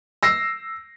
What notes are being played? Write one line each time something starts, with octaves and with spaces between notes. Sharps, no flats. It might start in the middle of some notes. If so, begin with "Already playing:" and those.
E6 A#6 C7